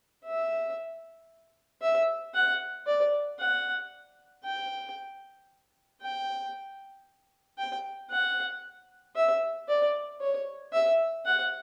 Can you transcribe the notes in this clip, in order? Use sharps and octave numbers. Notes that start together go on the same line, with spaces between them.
E5
E5
F#5
D5
F#5
G5
G5
G5
F#5
E5
D5
C#5
E5
F#5